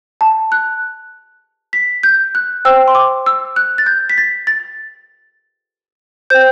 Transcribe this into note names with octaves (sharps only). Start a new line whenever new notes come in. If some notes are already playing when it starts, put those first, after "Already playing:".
A5
F#6
B6
G6
F#6
C5 G5 E6
C6
D6
E6
F#6
A6
G6
B6
A6
A6
C5 G5 G6